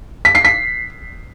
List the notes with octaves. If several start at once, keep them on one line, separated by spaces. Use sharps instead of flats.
B6
C7
B6